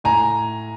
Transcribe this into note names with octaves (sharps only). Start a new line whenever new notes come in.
A2 G#5 A#5